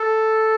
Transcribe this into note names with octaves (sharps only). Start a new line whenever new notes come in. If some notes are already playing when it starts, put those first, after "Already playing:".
Already playing: A4